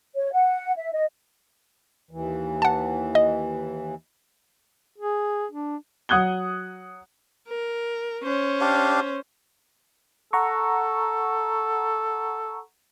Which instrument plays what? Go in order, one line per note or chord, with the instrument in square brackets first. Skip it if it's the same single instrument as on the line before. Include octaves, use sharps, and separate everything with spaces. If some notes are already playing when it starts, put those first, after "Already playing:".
[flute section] C#5
F#5
E5
D#5
[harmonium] D#2 E3
[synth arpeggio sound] F#5 A5
D#5
[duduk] G#4
D4
[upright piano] F#3 F#5 D#6 F#6 G#6 G7
[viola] A#4
C#4 C5
[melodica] D4 G4 F5
[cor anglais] A4 [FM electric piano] F#5 A#5 C#6